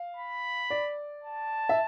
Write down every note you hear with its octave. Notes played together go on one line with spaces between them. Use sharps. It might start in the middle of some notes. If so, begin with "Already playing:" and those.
Already playing: F5
B5
D5
A5
E5